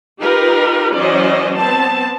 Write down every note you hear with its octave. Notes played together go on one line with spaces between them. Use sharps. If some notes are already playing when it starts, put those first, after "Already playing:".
D#4 F4 G4 A#4 B4
E3 F#3 C#4 C5 D5 D#5
B3 C4 A5